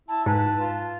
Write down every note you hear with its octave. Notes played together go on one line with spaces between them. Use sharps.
E4 A5
G#2 B4 A5
F4